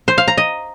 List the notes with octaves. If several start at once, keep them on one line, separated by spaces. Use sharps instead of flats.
C5
F5
A#5
D#5